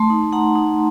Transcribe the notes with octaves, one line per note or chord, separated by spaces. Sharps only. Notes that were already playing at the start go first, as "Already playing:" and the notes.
Already playing: A3 A5 C6
D#4
D#4 F#5 A#5
D#4